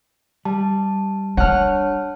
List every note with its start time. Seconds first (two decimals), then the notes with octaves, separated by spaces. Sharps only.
0.45 G3 A5
1.37 D4 C#5 F#5 A5 F6